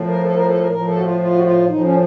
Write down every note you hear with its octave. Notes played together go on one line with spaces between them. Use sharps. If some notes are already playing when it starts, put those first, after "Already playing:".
Already playing: A2 F3
A#4
A4
A#4
A4
A#4
A2 F3 A#4
A4
F#4
F4
F4
F#4
F4
A2 F3 D#4
C#4